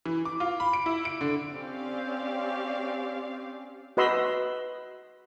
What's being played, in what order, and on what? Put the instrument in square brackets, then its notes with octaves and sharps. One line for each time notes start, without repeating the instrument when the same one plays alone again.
[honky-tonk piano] E3
D6
F4
B5
D7
E4
D7
D3
[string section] C4 C#4 G4 D5 F5
[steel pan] F#4 B4 D#5 B5 C6 E6